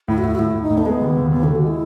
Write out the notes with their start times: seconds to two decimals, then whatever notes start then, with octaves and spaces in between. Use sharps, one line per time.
0.08 A2 E4
0.18 F#4
0.23 A2 E4
0.35 F#4
0.39 A2 E4
0.55 A2
0.62 D#4
0.70 A2
0.78 A3
0.85 G#3 B3
1.01 D#2
1.17 D#2
1.32 D#2 B3
1.44 D#2 A4
1.55 F#4
1.64 G#3 E4